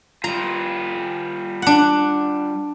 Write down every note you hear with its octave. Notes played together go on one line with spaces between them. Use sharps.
G3 F4 A#5
D4 F#5